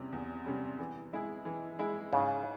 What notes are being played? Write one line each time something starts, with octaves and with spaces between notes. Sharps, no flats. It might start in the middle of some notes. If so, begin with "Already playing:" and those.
Already playing: E2 C3 G3 C#4
E2
C3 G3 C#4
E3
G#3 E4 G#4
E3
G#3 E4 G#4
G#2 C#3